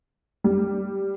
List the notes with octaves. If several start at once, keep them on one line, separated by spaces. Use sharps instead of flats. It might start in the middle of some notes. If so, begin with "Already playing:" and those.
G3